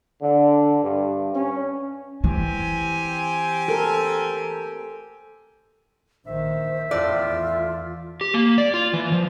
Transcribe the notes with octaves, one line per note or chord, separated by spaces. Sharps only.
D3
G2
C#4
E3 C4 G4 G#5
A4 A#4
A#1 D#3 C5 E5
E2 A2 F4 D5
G4
A#3
D5
F4
E3
F3